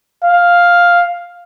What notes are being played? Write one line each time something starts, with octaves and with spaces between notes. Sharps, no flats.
F5